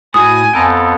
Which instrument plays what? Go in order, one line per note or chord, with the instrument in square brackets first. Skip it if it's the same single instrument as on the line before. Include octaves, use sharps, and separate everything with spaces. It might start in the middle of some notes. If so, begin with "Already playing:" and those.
[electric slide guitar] A2 E4 F#4 [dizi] G#5 [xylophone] D#6
[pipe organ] F2 B3 A4 [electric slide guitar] G5 A5 A#5